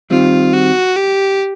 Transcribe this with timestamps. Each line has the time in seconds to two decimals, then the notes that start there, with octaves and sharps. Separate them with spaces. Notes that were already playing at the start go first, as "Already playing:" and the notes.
0.10 D#3 G3 C4 F4
0.54 F#4
0.96 G4